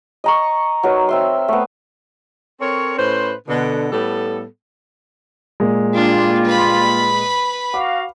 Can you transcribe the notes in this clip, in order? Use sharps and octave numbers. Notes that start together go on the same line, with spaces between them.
D#5 A#5 C#6
F#3 D#4 A#4 B4
C4 E5 C6
A3 B3
C4 A4 A#4 C#5
A2 C#4 B4 C5
B2 D3
A2 G3 B3 A4
A#2 G#3
G3 A#3 D4 F4
B4 B5
F#4 F5 D6